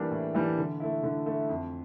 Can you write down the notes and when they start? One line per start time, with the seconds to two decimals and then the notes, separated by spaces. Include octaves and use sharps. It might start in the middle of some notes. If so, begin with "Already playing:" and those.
Already playing: E3 G3 A#3 D4
0.11 A2
0.34 E3 G3 A#3 D4
0.58 D3
0.80 A3 E4
1.03 D3
1.26 A3 E4
1.49 F2